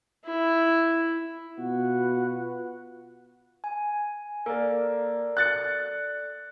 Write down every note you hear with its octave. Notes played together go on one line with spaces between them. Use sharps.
E4
B2 F4 F#4 B4 F#5
G#5
A#3 A4 D5
F#6 A6 C#7